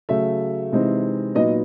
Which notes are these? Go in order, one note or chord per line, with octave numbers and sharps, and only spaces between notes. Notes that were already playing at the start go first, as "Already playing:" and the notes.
C#3 F#3 A3 E5
C3 E3 G#3 C4 D#4
A#2 F#3 B3 D#4 D#5